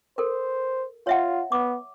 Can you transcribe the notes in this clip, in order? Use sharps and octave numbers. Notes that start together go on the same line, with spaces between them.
A4 A#4 C5
F4 C#5 E5 F#5
B3 D6